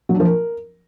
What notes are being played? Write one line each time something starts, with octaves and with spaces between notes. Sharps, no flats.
F#3
D4
F3
A#4